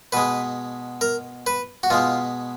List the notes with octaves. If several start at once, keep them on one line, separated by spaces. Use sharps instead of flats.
B2 G#3 B4
A#4
B4
F#4
B2 G#3 F4